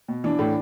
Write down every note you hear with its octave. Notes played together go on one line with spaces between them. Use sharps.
B2
E3 D4
A2